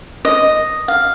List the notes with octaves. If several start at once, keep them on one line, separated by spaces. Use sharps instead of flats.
D#5
F5